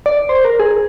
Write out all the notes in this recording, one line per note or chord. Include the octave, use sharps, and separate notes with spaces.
D5
C5
A#4
G#4